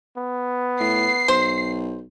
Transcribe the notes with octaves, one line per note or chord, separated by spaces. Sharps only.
B3
A2 C7
B1 C5